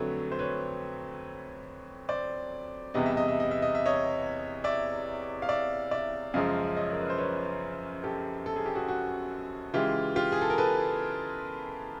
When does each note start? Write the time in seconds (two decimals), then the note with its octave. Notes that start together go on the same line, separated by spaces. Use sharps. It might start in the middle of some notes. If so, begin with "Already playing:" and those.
Already playing: F2 D3 F#3 A3 B4 C#5
0.32 C5
0.39 B4 C#5
2.09 C5 D5
2.94 E2 C3 E3 G3 B3 D#5
3.06 E5
3.17 D#5
3.28 E5
3.40 D#5
3.51 E5
3.62 D#5
3.75 E5
3.86 C#5 D#5
4.64 D5 E5
5.42 F5
5.49 D5 E5
5.91 D5 E5
6.34 F#2 C#3 F3 G#3 D#5 F5
6.76 C#5 D#5
6.92 A#4
7.01 B4
7.10 C5
7.18 B4 C#5
8.04 G4 A4
8.46 A4
8.56 G#4
8.66 G4
8.75 F#4 G#4
8.88 F#4
9.73 C#3 E3 G#3 F4 G4
10.16 F4 G4
10.32 G#4
10.41 A4
10.50 A#4
10.58 A4 B4